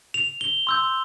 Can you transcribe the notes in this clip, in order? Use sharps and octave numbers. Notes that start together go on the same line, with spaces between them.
F7
G7
C6 E6 G6